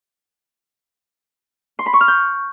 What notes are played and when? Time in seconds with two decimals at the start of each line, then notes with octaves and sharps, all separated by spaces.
1.79 C6
1.86 B5
1.93 C#6
2.01 F6
2.08 G6